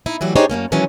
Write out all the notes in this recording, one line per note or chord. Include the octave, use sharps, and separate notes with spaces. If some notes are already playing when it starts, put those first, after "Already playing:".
D#4 E4
E3 F#3 G3 A3 F#4
D4 D#4 G4 G#4 C5 C#5
F#2 C3 A#3 C#4
D#3 E3 F#3 G#3 C#4 D4